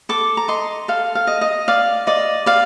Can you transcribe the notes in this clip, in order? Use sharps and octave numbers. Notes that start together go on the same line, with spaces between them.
A4 D6
A#5
D#5 C6
A4 F5
F5
D#5
D#5
D5 F5
D5 D#5
D5 F5